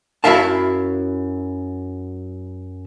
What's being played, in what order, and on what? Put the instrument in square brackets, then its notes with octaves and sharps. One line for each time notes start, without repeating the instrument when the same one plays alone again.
[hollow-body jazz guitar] F#2 A3 E4 E5 F5 A5